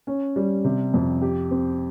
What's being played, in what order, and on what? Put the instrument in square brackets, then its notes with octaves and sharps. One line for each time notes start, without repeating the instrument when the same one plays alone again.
[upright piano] C#4
G3
C3
F2
G4
C4